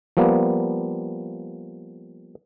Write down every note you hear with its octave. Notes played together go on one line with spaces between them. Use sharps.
F3 G3 A#3 B3